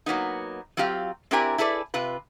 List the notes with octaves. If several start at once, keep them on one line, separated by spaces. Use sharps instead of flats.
F#3 A#3 B3 D#4
F#3 C4 F4 G4 F5
C4 D4 E4 G4 A#4 G#5
E4 G#4 A4 B4 D5
C3 F4 B4